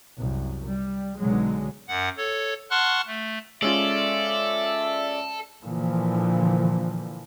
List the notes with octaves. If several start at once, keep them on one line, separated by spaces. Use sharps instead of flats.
C2 F#2
G3
B1 B2 D3 F#3 G#3
F#2 F#5
A4 C#5
F#5 A5 C6 C#6 F6 F#6
A3
G#3 C#4 F4 A4 D5 E5
A#2 D3 E3 F3